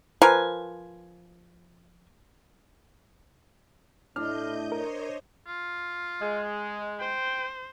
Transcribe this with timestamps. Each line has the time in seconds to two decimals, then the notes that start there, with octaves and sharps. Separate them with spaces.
0.22 F3 A#4 B4 G#5
4.16 A2 A3 D4 E4 D#5 F6 G6
4.72 A#4 C5 C#5 D#5
5.47 F4
6.22 G#3
7.00 C5 G5